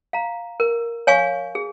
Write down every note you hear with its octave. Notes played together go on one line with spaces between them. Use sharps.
F5 A#5
A#4
C#5 F5 G#5 C#6
G#4